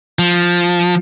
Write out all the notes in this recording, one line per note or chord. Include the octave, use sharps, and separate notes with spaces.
F3